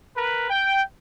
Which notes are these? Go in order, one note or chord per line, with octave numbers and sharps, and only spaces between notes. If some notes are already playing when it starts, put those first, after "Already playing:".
A#4 B4
G5